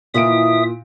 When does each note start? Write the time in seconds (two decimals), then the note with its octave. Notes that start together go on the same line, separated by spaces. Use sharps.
0.14 A#2 D#3 E3 A#3 E5 D#6 D7